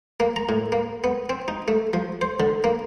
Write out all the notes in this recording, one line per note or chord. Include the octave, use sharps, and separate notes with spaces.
A#3
A#5
A2
A#3
B3
C4
D#4
A3
F3
C5
D3
A#3